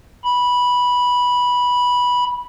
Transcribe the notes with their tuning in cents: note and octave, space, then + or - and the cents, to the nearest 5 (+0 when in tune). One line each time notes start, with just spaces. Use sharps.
B5 -10